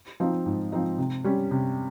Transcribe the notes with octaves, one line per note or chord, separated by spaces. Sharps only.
F3 C4 D#4
G#2
F3 C4 D#4
C3
G3 C#4
C3